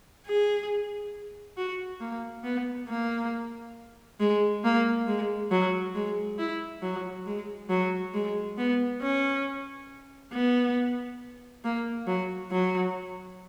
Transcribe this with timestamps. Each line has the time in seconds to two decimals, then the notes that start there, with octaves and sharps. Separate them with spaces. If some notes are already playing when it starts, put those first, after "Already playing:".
0.26 G#4
1.57 F#4
2.00 A#3
2.44 B3
2.88 A#3
4.20 G#3
4.64 A#3
5.07 G#3
5.51 F#3
5.95 G#3
6.38 E4
6.82 F#3
7.26 G#3
7.70 F#3
8.14 G#3
8.58 B3
9.02 C#4
10.33 B3
11.64 A#3
12.07 F#3
12.51 F#3